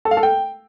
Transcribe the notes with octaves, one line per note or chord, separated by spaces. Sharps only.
A4
F5
A4
G5